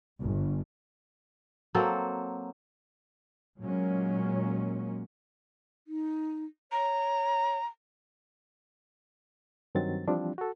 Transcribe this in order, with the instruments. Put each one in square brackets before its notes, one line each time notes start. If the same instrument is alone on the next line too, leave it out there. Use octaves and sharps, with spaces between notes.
[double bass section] G1
[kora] F#3 A#3 C4 A4
[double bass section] A#2 F#3 G#3 A#3 C#4
[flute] D#4
[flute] C#5 [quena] A#5
[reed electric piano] G2 D#3 F#3 C4 A6
E3 F3 G3 C4 D4
F#4 A4